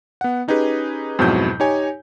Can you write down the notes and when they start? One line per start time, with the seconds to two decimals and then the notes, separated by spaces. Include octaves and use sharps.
0.21 B3 F#5
0.48 C#4 D#4 G4 G#4 B4
1.19 F2 G#2 B2 F#3 E4 G6
1.60 D#4 G4 C#5 G#5